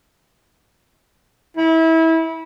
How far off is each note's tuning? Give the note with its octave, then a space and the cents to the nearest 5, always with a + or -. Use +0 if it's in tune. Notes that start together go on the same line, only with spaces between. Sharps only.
E4 -25